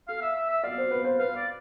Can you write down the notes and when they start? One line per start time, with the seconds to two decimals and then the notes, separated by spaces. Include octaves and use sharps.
0.08 A4 F5
0.22 E5
0.36 E5
0.49 E5
0.64 D5 F5
0.78 C5
0.91 B4
1.04 C5
1.19 B4 F5
1.36 D5